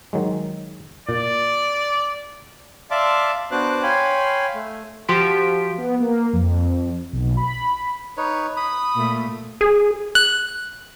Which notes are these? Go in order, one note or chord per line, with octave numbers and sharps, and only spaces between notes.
D#3 F#3 G#3
A#2 D5
D5 E5 F5 A5 C6 D6
B3 D4 F#4 C5 D6 F#6
C#5 F5 G5 G#5 B5 C6
A3
F3 F#4 G4 C6 B6 D7
B3
A#3
F2
B1
B5
D#4 B4 C#5
B5 D#6
A#2 A3
G#4
F#6